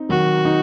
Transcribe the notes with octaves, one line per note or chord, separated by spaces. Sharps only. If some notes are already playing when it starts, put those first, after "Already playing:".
Already playing: C4 D#4
D#3 F#3 F#4
D#4